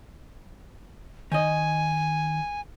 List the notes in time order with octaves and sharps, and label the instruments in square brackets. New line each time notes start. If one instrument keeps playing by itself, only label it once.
[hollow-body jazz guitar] D#3 D#5 [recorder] G#5